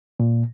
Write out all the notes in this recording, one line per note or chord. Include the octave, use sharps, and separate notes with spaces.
A#2